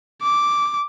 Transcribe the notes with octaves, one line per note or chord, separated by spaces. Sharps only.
D6